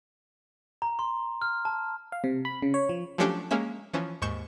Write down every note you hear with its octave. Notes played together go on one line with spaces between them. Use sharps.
A#5
C6
F6
A5
F5
C3
B5
C#3
C#5
F3
F3 F#3 A3 C#4 D4 G4
G#3 A#3 C#4 E5
E3 F3 C#4
D#2 G#2 C#6 G6 E7